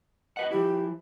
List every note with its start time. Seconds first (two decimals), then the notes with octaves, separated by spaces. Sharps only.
0.37 F#4 B4 D#5 F#5
0.51 F3 E4 G4